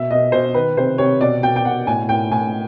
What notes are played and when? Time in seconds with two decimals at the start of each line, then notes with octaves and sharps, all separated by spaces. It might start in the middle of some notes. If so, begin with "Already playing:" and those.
Already playing: B2 E5
0.11 B2 D#5
0.32 B2 C5
0.54 D#3 B4
0.77 C3 C5
0.98 C3 C#5
1.21 B2 D5
1.43 B2 G5
1.56 G5
1.65 B2 F#5
1.87 A2 G#5
2.09 A2 G5
2.31 A2 G#5